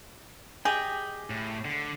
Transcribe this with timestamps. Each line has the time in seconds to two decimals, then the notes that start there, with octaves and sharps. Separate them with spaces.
0.65 G4 G#4 D#5 G5
1.30 A2
1.65 D3